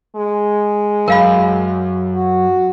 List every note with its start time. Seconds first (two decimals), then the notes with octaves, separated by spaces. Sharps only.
0.16 G#3
1.08 F#2 A#4 F5 B5
2.15 F#4